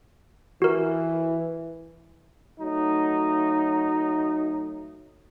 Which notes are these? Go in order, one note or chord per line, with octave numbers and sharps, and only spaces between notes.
E3 F#4 A#4
F#3 A3 D#4